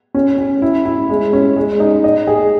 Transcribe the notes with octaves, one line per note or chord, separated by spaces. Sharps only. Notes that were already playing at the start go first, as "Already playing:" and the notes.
C#4
C#4
E4
E4
G#3
C#4
G#3
D#4
D#5
G#4